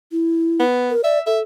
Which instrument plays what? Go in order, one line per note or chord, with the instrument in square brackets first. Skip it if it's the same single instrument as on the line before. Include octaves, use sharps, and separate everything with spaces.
[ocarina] E4
[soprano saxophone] B3
[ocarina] A#4
[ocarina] D5 [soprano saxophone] E5
[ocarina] A4 [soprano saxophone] E5